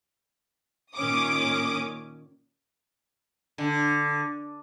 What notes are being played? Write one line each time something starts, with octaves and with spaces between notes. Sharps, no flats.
A#2 D#3 C#4 D6 D#6
D3